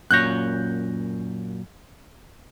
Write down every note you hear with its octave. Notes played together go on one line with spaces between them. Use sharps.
F#2 A#2 C#5 F#6 G6 A#6